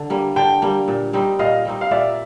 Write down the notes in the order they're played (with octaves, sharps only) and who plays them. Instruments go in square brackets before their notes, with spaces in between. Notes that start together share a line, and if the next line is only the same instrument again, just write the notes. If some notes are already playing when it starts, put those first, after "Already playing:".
Already playing: [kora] D3
G3 A#3
[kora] D3 [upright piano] G5 A5
[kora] G3 A#3
A#2
G3 C4 D#4
[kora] A#2 [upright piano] D#5 F5
[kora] G3 C4 D#4
[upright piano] F5
[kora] A#2 [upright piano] D5 E5